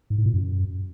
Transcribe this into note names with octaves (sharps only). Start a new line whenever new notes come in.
G#2
A2
A#2
F#2